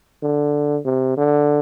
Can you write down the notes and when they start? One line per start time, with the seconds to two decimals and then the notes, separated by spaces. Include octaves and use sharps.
0.23 D3
0.86 C3
1.17 D3